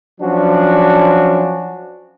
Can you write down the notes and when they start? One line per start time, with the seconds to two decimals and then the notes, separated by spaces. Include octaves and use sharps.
0.20 F3 F#3 C#4 D4 F#4